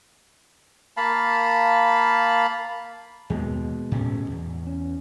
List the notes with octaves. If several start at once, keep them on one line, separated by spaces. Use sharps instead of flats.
A#3 F5 A5 B5
D#2 B2 G#3
A2 C#4
E2
C#4